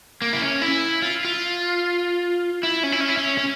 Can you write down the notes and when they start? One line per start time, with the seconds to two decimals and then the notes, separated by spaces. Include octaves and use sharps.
0.22 A#3
0.33 E4
0.42 C#4
0.62 E4
1.02 F4
1.25 F4
2.63 E4
2.83 C#4
2.92 E4
3.01 C#4
3.09 E4
3.17 C#4
3.38 C#4